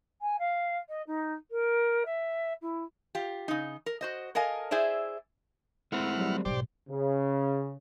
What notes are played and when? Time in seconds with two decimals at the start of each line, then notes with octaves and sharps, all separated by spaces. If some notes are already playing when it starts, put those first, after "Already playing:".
0.21 G#5
0.39 F5
0.89 D#5
1.07 D#4
1.51 A#4
2.06 E5
2.62 E4
3.15 F4 G4
3.48 C#3 D#4
3.86 A#4
4.01 F#4 C5 D#5
4.35 A4 A#4 D#5 F5 G#5
4.71 E4 G#4 C5 D5 E5
5.92 G#3 A3 C4 E4 F#5 F6
6.18 F#3 G3
6.45 B1 G#2 G4 C5 D5
6.89 C#3